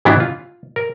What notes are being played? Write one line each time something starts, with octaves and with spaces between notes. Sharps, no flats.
G#2 E3 F#3 B3 D4 E4
F4
A#4